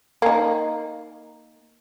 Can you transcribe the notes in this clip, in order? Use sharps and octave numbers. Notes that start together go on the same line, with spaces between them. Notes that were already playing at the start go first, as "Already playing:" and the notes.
A#3 D#4